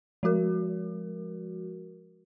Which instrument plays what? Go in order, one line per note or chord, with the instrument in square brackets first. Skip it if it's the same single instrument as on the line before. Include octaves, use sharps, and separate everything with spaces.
[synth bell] F3 G#3 F#4 A#4